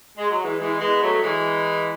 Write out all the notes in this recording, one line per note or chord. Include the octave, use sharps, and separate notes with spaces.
G#3
F#3
E3 G#3
E3 G#3
G#3 B3
F#3 A3
E3 G#3